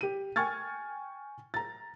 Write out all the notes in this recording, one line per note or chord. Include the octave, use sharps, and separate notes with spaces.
G4 D#7
G5 G#5 C#6 F6 G#6 A6
A#5 A6